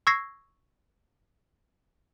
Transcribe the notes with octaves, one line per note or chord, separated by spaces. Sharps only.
C#6 E6 G#6 A#6 C7